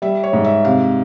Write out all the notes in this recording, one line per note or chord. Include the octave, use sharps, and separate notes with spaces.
G3 E5
C#5
G#2
E5
C3 F5